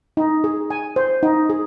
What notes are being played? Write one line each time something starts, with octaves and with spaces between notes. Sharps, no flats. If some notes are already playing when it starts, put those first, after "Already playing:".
D#4
G#4
G#5
C5
D#4
G#4